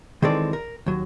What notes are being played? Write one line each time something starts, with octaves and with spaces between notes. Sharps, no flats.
D#3 E3 G#3 C4 A4 D5
A#4
D#2 F#3